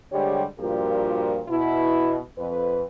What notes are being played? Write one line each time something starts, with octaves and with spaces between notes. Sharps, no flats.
D3 G3 G#3 G4 C5 C#5
G2 A#2 F3 F#4 G4 A#4
B2 E4
F2 B4